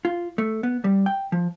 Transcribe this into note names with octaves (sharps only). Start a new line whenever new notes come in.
F4
A3
B3
G3
G5
F3